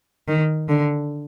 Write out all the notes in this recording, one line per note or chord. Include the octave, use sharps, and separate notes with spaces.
D#3
D3